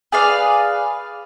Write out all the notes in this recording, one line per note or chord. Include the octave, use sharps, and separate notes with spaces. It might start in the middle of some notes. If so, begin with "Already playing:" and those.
G#4 B4 D5 F5